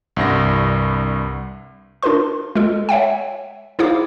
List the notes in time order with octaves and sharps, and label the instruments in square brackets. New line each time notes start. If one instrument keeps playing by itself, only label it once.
[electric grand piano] C2 G2 A#6
[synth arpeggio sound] D4 F4 A#4 B4 C6
G#3 F4 A4
C#5 E5 F#5 G5
D#4 E4 G#4 C5 F5 D6